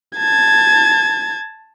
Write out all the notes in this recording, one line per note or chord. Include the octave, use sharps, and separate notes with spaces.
A5 G#6